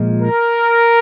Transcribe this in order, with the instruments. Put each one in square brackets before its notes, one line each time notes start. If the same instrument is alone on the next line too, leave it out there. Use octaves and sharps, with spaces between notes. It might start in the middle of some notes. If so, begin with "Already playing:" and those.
Already playing: [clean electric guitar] A#2 F3 G#3
[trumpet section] A#4